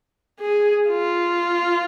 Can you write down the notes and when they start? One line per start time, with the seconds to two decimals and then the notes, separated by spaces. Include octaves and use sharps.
0.40 G#4
0.88 F4